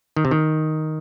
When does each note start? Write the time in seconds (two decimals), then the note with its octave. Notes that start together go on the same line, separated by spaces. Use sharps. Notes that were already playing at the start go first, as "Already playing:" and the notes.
0.17 D#3
0.25 C3
0.31 D#3